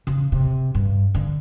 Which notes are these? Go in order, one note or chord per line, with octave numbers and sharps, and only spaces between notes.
C#3
C3
G2
D3